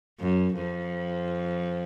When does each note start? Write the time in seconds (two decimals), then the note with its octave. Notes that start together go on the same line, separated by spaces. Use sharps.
0.20 F#2
0.55 F2